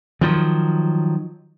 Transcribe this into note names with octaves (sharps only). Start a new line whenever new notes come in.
D#3 F3 F#3